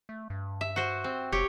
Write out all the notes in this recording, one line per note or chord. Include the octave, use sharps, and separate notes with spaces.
A3
G2
E5
F#4 C5
C4
F1 G4 C#5